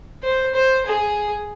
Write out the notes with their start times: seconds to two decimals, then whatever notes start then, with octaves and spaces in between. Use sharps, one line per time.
0.23 C5
0.54 C5
0.86 G#4